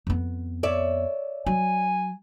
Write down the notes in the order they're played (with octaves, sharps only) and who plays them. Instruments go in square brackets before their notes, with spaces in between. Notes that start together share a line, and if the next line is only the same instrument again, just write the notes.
[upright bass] F2 B3
[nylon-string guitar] C#5 D5 E5
[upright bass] F#3 [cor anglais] G#5